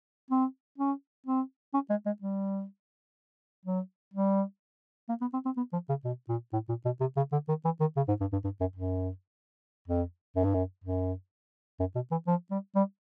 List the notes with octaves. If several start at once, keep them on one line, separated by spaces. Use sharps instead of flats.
C4
C#4
C4
C#4
G#3
G#3
G3
F#3
G3
A#3
B3
C4
C4
B3
F3
C#3
B2
A#2
A2
A#2
B2
C3
C#3
D3
D#3
E3
D#3
C#3
G#2
G2
G2
G2
F#2
F#2
F2
F#2
G2
F#2
F#2
F#2
B2
E3
F3
G3
G3